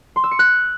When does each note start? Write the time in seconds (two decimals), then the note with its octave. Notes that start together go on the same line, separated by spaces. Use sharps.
0.16 C6
0.24 E6
0.31 C#7
0.39 F#6